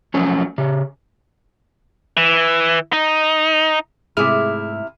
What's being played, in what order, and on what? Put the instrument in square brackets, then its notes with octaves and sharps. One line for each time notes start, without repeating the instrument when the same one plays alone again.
[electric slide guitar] F3 F#3 A3 C#4
C#3 G4
[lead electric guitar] E3
D#4
[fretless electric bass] G#2 A3 [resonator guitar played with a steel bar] C3 E4 [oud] G#4 [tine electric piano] E5 F6